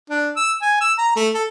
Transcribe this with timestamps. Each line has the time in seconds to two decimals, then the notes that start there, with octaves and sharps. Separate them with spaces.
0.10 D4
0.37 E6
0.62 G#5
0.81 E6
0.98 A#5
1.16 A3
1.34 A4